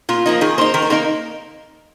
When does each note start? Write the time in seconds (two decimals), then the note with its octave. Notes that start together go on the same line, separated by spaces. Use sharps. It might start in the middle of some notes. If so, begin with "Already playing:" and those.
0.09 A#2 F4
0.26 F3 A#3 D#4
0.41 D#3 G#4
0.58 A#3 D#4 C5
0.74 D#3 A#4
0.82 C5
0.90 A#3 D#4 A#4